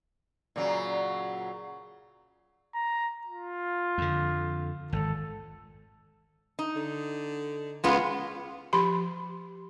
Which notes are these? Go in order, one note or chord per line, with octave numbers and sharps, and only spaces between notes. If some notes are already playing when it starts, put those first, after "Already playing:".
A#2 C#3 F#3
A#5
F4
F2 D3
G#1 A4
D#4
D3
C#2 G#3 B3 F4
F3 G4 B5 C6